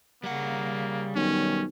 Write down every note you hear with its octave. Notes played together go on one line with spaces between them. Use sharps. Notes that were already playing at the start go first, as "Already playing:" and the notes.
C#3 G3 A#3 F#5
B1 D#3 C#4